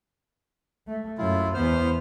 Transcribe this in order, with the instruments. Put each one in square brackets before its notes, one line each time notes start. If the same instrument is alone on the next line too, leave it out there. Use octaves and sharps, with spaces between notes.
[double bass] A3
[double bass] F#2 A3 [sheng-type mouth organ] E4 F4
[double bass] E2 B3 [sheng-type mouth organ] C5 F6